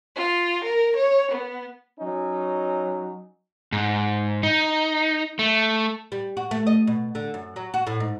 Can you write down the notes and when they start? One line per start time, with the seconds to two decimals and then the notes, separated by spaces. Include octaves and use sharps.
0.16 F4
0.65 A#4
0.97 C#5
1.32 B3
1.99 F#3 C#4 D#4
3.72 G#2
4.43 D#4
5.39 A3
6.12 G3
6.37 F#4
6.51 A3
6.67 D#5
6.87 B2
7.15 D3
7.34 F#2
7.56 F#3
7.74 F#4
7.87 A2
8.00 G#2